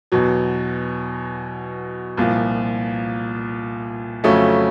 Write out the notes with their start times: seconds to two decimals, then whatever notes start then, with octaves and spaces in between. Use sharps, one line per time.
0.12 E2 B2 F#3
2.17 C2 A#2 F3
4.24 F2 C#3 F#3 A3 C#4